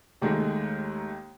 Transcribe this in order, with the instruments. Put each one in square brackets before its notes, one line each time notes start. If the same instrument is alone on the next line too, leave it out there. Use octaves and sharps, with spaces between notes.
[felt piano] D#2 D#3 G#3 A3